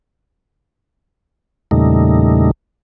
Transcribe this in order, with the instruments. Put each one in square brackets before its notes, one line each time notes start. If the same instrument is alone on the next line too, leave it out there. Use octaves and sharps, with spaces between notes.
[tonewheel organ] E2 A#2 C#3 G3 A3 D#4